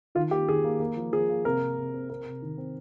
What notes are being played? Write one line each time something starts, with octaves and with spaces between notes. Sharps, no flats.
D#3 F4
A#3 G4
D#3 G#4
A#3
A#3
F3
F3 G#4
A#3
C3 A#4
C3
C3
C4
C4 A#4
C3
D#3
C4